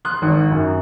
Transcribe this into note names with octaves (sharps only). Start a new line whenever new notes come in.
C6 D#6 F#6
G#1
F#2